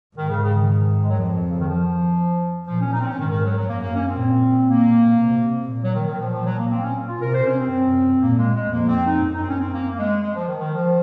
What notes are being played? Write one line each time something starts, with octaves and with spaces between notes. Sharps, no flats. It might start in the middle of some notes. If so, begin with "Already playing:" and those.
G#2 D#3
C#3
C#3
D#3
G#3
F#3
F2 F3
C#3
D#3
F3
A#2 F3
C#4
D#4
C4
C#4
G#2 D#3
D#3
F#3
F#3
F#2 A#3
A#3
C#4
C4
A#2
A#3
C3
A#2
F#3
D#3
D#3
A#2 F3
F3
F#3
A#3
C4
C#4
F4
C3 A#4
C5
C#4
C4
F#2
A#2 A#3
G#3
G#3
F2 A#3
C4
D#4
F#2
D#4
C4
C#4
C4
A#3
A#3
G#3
G#3
F3
D#3
D#3
F3